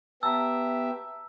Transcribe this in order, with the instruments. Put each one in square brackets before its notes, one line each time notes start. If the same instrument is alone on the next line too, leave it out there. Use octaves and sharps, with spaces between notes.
[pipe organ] B3 G4 E5 [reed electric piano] A5 A#5 [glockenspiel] E6